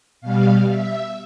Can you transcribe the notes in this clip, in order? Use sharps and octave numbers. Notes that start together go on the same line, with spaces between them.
B2 G3 F5
E5